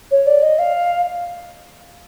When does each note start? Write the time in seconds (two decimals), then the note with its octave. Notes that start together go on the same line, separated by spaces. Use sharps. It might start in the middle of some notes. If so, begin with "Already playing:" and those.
0.11 C#5
0.27 D5
0.43 D#5
0.59 F5